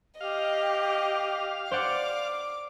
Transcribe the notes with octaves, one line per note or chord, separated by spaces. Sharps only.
G4 D#5 F5
C5 D5 F#5 D6